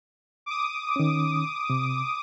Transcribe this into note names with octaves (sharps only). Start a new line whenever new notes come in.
D6 D#6
D#3 C#4
C3